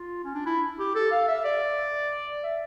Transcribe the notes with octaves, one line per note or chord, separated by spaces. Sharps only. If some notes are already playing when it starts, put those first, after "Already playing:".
Already playing: F4
C#4
D4
E4
G4
A4
F5
E5
D5
E5